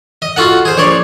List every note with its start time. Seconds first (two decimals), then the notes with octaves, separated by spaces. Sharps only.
0.22 D#5
0.36 F4 F#4 A4 F#5
0.65 G#4 C5
0.78 A#1 C#5 D5 C6